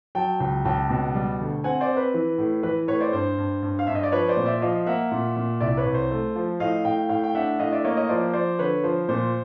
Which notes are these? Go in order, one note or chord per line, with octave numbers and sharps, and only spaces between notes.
F#3 G5 A5
C#2
C#2 G5 A5
B2
G3
D2
C4 F#5 G#5
C5 D5
C4
B4
E3
A2
E3 B4
A2 B4 C#5
C5 D5
G2 C5
G2
G2
F5
G2 E5
D#5
D5
F3 B4 C#5
C5 D5
A#2
D5 E5
F3 D#5 F5
A#3 E5 F#5
A#2
A#2
C2 D5 E5
B4 C#5
C2
C5
A3
F3
A2 D#5 F5
A2 F5 G5
A2 F5 G5
G5
D4 E5 F#5
A2 D#5 F5
D5 E5
A#3 C#5 D#5
C#5 D#5
F3 C5 D5
F3 C5 D5
D3 B4 C#5
F3 C5
A#2 C5